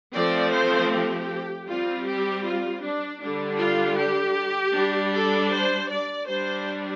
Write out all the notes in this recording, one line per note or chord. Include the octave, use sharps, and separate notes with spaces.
F3 A3 C4 D5
C5
G4
G3 C4 F4
G4
F4
D4
D3 G3 D4
F4
G4
G3 D4
A4
C5
D5
G3 D4 C5